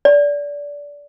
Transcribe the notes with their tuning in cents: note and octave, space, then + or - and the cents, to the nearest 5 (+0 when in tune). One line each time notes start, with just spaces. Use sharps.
D5 -20